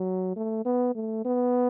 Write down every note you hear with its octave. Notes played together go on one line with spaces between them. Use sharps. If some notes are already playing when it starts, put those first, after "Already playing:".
Already playing: F#3
A3
B3
A3
B3